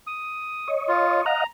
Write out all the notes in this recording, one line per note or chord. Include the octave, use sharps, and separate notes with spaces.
D#6
C#5 D#5
F4
D#5 F5 F#5 A#5